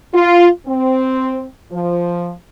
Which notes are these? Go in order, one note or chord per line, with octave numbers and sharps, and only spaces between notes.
F4
C4
F3